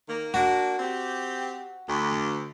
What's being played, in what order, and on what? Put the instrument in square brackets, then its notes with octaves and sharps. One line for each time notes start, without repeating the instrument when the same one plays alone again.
[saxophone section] D#3 A#3
[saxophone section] A#3 D4 [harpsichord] F#4
[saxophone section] C4 G4
D2